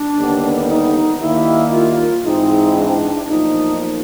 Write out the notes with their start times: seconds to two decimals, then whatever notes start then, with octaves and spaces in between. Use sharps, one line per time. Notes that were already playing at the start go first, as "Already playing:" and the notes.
Already playing: D4
0.17 D#2 D3 G3 B3
0.68 D#4
1.21 D#2 D#3 G3 A#3 E4
1.72 F4
2.24 G#2 E3 G#3 C4 D#4
2.76 D4
3.28 B1 A#2 F3 D#4